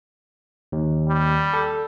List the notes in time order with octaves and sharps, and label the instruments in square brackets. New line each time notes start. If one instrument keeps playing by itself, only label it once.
[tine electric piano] D#2
[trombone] G3
[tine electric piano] A4